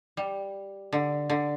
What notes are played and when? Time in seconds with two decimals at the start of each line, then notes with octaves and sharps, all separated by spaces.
0.17 G3
0.92 D3
1.30 D3